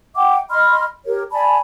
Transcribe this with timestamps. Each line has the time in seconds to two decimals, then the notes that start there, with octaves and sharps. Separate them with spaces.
0.15 E5 F#5 G5 D6
0.49 D#5 B5 C6 F6
1.06 G4 A#4 C#5
1.32 D5 G#5 A5 B5